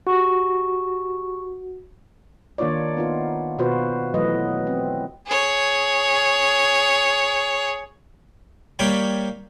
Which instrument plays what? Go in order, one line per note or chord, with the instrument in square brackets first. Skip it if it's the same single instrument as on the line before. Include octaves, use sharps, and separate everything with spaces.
[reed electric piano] F#4 [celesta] G4 C#6
[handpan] D#3 A#3 D4 F4 C#5 D5
B3 D#4 F4
B2 F4 F#4 B4 C5
E3 F#3 A3 B3 B4 D#5
C4
[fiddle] G#4 C#5
[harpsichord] G3 A#3 C#5 G5 B5